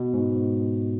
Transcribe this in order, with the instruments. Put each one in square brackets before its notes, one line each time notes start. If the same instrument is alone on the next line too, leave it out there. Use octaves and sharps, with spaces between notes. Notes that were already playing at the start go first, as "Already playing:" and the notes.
Already playing: [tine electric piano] B2
G#2